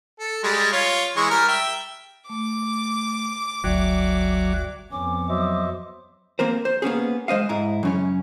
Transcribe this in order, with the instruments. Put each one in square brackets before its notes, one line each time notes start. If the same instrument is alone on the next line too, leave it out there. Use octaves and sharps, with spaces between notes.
[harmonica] A4
G3 G#3 G#4
F4 C#5
E3 G#3 C#6
G3 A#4 F6
E5 G5
[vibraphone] A3 [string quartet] D6
[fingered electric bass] G1 D2 [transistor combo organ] F#3 [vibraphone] D5 E5 G5
[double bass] F2 B3 [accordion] C#4 [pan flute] D6
[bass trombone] F#3 [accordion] C5 D#5 E5
[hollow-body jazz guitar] A#3 C4 A#4 C5
C5
A#3 B3 C#4 G#4
G#3 C5 D#5 F5
G#2 E4 A#5
F#2 C#3 C#4